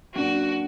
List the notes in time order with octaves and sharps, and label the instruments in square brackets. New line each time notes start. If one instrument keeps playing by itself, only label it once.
[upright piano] F#3 A#3 D4 [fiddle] F#4